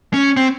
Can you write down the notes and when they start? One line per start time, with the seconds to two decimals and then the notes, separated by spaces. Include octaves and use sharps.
0.14 C#4
0.37 C4